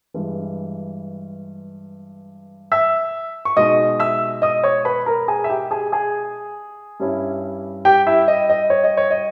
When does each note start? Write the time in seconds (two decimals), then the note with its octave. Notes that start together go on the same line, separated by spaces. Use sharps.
0.14 G2 E3 G#3
2.72 E5 E6
3.45 C#6
3.57 B2 G#3 D#4 D#5 D#6
4.00 E5 E6
4.42 D#5 D#6
4.64 C#5 C#6
4.85 B4 B5
5.06 A#4 A#5
5.28 G#4 G#5
5.44 E5
5.49 G4 G5
5.71 G#4 G#5
5.92 G#4 G#5
7.00 G2 G3 C#4 E4
7.85 G4 G5
8.07 E4 E5
8.28 D#5
8.49 D#5
8.70 C#5
8.84 D#5
8.97 C#5
9.11 D#5